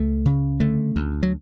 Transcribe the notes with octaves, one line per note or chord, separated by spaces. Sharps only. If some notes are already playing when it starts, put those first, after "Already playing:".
Already playing: C#2 A3
C#3
D3 A3
D2
F#3